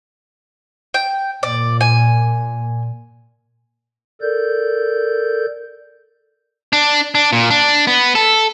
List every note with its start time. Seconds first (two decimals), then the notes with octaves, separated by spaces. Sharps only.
0.94 G5
1.43 A#2 D5
1.81 G#5
4.21 A4 A#4 D5 G6
6.73 D4
7.15 D4
7.33 A#2
7.50 D4
7.87 B3
8.15 A4